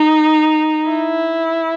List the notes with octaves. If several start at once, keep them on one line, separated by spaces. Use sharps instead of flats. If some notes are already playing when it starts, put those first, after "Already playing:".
Already playing: D#4
E4